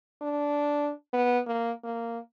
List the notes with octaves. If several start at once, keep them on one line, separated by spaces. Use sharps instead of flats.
D4
B3
A#3
A#3